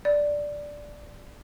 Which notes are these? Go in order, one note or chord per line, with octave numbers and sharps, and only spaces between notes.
D5